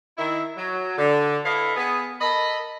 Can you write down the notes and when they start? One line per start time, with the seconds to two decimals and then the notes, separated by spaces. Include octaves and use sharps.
0.18 D#3 E4
0.57 F#3
0.98 D3
1.44 E4 A4 B4 C#5 D#5 F5
1.76 B3 G#4
2.21 A4 A#4 D#5 B5